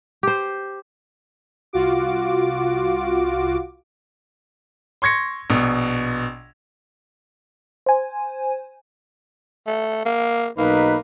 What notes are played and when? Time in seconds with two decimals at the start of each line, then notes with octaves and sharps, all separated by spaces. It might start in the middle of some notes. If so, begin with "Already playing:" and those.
0.23 G4 C5
1.73 C2 F4 F#4 D6
5.02 C6 C#6 G#6 A#6 C#7
5.50 A#1 B2
7.86 C5 G#5
9.67 A3
10.05 A#3
10.58 B1 A#3 D#4 B4